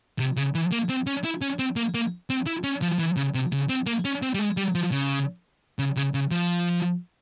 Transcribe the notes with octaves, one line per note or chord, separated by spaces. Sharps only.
C3
C#3
E3
A#3
C4
C#4
E4
C#4
C4
A#3
A#3
C4
E4
C#4
F3
E3
C#3
C3
C#3
C4
A#3
C#4
C4
G3
G#3
G3
F3
C#3
C#3
C#3
C#3
F3